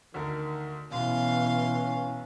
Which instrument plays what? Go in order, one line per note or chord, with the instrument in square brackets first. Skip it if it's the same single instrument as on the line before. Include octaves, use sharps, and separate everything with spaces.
[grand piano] D2 D3 A#4 [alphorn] D#3
[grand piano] B1 [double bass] B2 E3 [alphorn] C#4 [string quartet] F5 C6